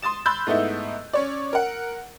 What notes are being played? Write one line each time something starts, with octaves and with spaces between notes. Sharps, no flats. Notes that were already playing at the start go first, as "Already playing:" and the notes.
C6 D#6 A6 E7
B5 C6 E6 F#6 G6 A6
G#2 A3 B3 D#4 E4
C#4 C#5 D5
A#4 F#5